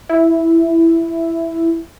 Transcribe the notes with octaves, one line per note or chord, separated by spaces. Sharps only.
E4